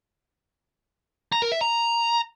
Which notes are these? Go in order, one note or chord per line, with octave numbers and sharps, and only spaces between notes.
A#5
A#4
E5
A#5